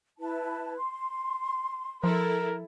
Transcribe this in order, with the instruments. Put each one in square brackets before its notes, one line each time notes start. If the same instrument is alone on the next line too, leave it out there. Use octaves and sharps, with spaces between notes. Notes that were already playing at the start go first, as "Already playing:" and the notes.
[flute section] E4 B4 A5
C6
[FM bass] F3 [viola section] E4 A4 [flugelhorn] A#4